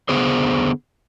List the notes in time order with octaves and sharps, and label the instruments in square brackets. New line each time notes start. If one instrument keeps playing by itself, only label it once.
[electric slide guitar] D3 B3 G#4 C5